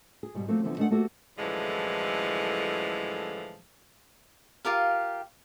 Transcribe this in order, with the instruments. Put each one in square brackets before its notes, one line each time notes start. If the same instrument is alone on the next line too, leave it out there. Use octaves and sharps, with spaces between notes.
[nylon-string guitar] G#4
G#2 B2 G3
F3 F#3 A3 A#3 C4
D3 E3 F3 B3 C4
G#3 A3 D4 A4 B4 F#5
A3 A#3 C4 F#4 G4 A4
[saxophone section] F#2 A2 D3 E3 F3 G#3
[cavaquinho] F4 G4 A#4 F5